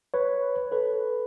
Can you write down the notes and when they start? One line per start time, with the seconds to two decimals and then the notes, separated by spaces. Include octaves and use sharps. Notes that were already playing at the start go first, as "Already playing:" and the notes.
0.14 B4 C#5
0.72 A4 B4